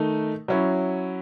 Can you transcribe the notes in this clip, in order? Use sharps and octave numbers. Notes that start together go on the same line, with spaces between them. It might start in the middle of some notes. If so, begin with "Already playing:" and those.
Already playing: D#3 A3 D#4
F#3 C#4 E4